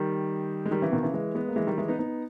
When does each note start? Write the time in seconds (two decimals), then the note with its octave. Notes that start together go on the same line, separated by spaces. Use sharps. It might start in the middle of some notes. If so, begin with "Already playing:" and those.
Already playing: D#3 G3
0.66 G#3
0.71 D#3 G3
0.82 C#3 E3
0.92 B2 D#3
1.03 C#3 E3
1.14 E3 G#3
1.35 G#3 B3
1.48 A#3
1.56 E3 G#3
1.67 D#3 G3
1.78 E3 G#3
1.88 B3 D#4
1.99 B3 D#4